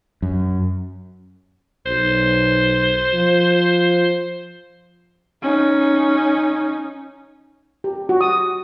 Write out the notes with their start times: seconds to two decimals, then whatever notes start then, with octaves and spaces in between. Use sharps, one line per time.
0.22 F#2
1.86 B1 C5
3.14 F3
5.42 C#4 D#4
7.84 G4
8.09 F#4
8.21 D#6